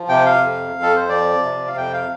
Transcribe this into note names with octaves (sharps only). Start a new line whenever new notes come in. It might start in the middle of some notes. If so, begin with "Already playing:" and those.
Already playing: F3
C3 G5
F5
F2
F2
A4
C5
F3 D5
C3
F5
F2 G5
F5